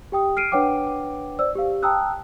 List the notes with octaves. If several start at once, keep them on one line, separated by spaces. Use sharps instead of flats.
G4 G5 D#6
F6 C7 D7 D#7
D4 B4 C#5 F#5 G5 D6
C5 D5 E6
G4 F5
G5 A5 A#5 D#6 E6 F#6